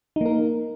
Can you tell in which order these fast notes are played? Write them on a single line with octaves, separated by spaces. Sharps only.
D#4 A#3 A#4